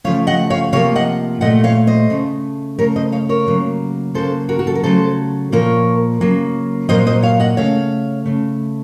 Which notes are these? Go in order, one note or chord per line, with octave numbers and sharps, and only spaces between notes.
C#3 F3 A3 C#5 F5
D#5 F#5
C#5 F5
C3 F3 A#3 C#5 F5
D#5 F#5
A#2 A3 D#5 F#5
C#5 F5
C5 D#5
C#3 A3
C#3 A3 A#4 C#5
C5 D#5
C#5 F5
A#4 C#5
C#3 F#3 A#3
C#3 F#3 A#3 A4 C5
F#4 A#4
F#4
A4
A#4
C#3 F#3 A3 A4 C5
A#2 F3 A#3 A#4 C#5
C#3 F#3 A#3
A#2 F#3 A#3 C5 D#5
C5 D#5
C#5 F5
D#5 F#5
C#3 A3 C#5 F5
C#3 A3